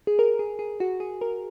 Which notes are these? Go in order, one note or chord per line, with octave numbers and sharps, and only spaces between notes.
G#4
A#4
G#4
G#4
F#4
G#4
A#4